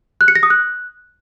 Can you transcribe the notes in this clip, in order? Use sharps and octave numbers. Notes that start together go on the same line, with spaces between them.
F#6
C#7
A#6
D#6
F#6